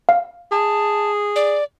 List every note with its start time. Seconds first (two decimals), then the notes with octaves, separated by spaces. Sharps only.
0.09 F5
0.52 G#4 A5
1.36 D5